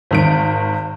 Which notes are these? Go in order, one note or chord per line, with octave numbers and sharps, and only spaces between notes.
G#1 D#3 D7